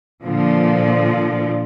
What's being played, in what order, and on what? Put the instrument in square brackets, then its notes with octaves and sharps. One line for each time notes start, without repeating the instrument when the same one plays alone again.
[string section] A#2 D3 F3